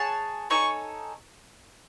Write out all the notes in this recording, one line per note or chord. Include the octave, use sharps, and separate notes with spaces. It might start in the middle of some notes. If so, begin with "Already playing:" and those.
Already playing: G#4 C#5 F#5 A5
D#4 A4 C#5 G#5 C#6